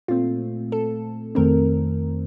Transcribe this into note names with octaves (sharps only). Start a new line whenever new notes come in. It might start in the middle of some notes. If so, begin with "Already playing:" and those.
A#2 A3 C4 F4
A4
F2 D#3 A3 C4 A#4